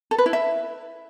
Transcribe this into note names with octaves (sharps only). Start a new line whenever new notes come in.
A4
B4
E4
E5